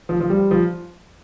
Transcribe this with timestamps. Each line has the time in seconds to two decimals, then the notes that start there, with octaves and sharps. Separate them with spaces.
0.09 F3
0.20 F3
0.30 G3
0.51 F3